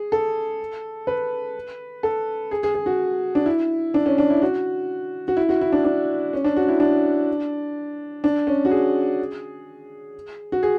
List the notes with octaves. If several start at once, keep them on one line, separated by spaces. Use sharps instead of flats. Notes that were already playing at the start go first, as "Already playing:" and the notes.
Already playing: G#4
A4
B4
A4
G#4
G#4
G#4
F#4
D4
E4
D4
C#4
D4
E4
F#4
F#4
E4
F#4
E4
D4
D4
C#4
D4
F#4
E4
D4
D4
C#4
F#4
G#4
F#4
G#4